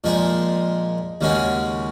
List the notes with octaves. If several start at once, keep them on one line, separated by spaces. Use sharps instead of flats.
A#2 F3 G#3 D#4 G#4
D#2 C#3 G#3 C#4 F#4